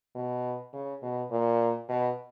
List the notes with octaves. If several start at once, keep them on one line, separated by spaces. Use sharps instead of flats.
B2
C#3
B2
A#2
B2